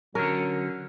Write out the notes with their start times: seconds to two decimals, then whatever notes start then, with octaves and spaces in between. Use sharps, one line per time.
0.15 D3 F#3 C#4 A#4